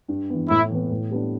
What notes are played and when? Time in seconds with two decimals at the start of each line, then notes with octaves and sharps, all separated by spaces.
0.08 G2
0.30 E3 B3
0.50 A2 E4
0.70 E3 B3
0.90 A2
1.11 G3 B3 D4